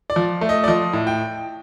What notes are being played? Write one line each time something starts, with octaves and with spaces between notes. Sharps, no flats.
D5
F3
A3
D#5
D5
F3 D#5
A2
G5